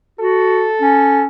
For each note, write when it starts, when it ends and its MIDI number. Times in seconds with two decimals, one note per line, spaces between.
0.20 0.69 66
0.20 1.24 69
0.82 1.28 61